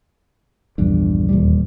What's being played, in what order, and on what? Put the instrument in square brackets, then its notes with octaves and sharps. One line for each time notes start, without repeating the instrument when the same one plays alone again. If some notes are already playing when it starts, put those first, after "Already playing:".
[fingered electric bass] A#1 E2 G2
D#1 G#1 E2 G3